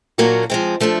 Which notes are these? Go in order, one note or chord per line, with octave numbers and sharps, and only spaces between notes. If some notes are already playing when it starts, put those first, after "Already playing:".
A#2 F#3 A#3 D4 F#4
F3 G#3 C4
F3 A3 D4